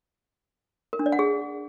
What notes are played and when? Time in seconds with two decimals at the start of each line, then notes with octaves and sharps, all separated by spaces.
0.93 A#4
0.99 D4
1.06 D5
1.12 F#5
1.19 G#4